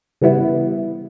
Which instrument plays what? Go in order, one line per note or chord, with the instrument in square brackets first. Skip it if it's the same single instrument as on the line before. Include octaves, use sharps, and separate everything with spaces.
[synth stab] C#3 E3 G3 B3 E4